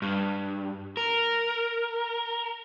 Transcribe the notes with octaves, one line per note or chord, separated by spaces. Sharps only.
G2
A#4